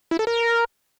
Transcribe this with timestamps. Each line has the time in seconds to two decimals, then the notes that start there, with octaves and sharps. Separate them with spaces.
0.11 E4
0.19 A4
0.27 A#4